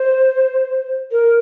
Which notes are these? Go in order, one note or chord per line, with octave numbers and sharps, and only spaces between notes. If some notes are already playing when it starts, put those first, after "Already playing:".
Already playing: C5
A#4